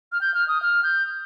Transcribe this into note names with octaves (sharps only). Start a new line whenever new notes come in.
F6
G6
F6
D#6
F6
G6